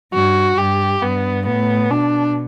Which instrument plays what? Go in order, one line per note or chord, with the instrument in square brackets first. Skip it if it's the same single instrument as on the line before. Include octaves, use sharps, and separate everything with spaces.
[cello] G2 [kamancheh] F#4
[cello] G2 [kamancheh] G4
[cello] G2 [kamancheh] B3
[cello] A2 [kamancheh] B3
[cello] B2 [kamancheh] D4